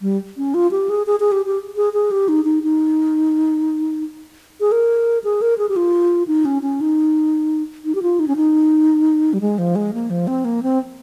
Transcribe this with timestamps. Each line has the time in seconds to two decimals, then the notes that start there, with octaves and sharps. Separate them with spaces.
0.02 G3
0.37 C#4
0.54 F4
0.71 G4
0.89 G#4
1.07 G#4
1.20 G#4
1.32 G4
1.46 G4
1.76 G#4
1.93 G#4
2.11 G4
2.28 D#4
2.45 D#4
2.63 D#4
4.60 G#4
4.72 A#4
5.24 G#4
5.42 A#4
5.58 G#4
5.69 G4
5.76 F4
6.27 D#4
6.45 C#4
6.62 C#4
6.81 D#4
7.85 D#4
7.95 G4
8.02 F4
8.19 D#4
8.28 C#4
8.36 D#4
9.33 G3
9.41 G#3
9.58 F3
9.76 G#3
9.94 A#3
10.10 F3
10.27 C4
10.45 A#3
10.63 C4